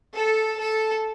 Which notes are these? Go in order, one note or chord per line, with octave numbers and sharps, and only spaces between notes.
A4
A4